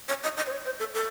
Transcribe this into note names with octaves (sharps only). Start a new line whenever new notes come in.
C#5
D#5
D#5
C5
C#5
C5
A4
A4